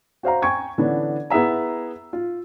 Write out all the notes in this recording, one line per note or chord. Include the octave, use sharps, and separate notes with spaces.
F#4 C5 F5 A#5
G5 G#5 C#6 G#6
D3 E3 B3 C#4 D4
B3 E4 G#4 E5 A#5
F4